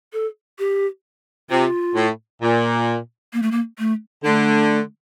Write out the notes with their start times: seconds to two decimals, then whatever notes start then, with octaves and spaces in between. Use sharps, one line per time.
0.13 A4
0.59 G4
1.50 C3 F4
1.95 A2
2.42 A#2
3.33 A#3
3.42 A3
3.51 A#3
3.79 A3
4.24 D3 A3